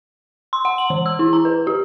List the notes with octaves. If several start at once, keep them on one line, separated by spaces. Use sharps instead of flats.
C6
F#5
F#7
E3
E6
E4
A#5
B4
G4